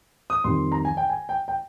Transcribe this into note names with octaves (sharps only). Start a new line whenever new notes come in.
D#6
F2 D#3 G3 C6
A#5
G#5
G5
G#5
G5
G5